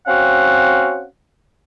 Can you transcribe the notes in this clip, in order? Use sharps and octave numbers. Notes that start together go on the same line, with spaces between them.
C4 C#4 F#4 F5 F#5